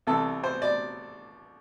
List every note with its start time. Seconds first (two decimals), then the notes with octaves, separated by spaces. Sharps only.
0.07 C2 C3 E3 A4
0.44 C5
0.62 D5